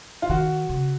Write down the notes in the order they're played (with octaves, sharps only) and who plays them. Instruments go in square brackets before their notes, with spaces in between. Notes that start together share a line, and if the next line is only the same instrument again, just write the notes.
[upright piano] F4
[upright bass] D#3 [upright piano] F#4
[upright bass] C#3